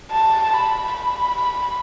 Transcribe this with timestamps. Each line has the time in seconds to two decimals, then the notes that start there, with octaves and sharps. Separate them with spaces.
0.12 A5
0.53 B5
0.94 B5